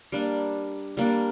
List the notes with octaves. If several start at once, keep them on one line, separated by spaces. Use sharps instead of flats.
G3 A#3 D4
G3 A#3 D4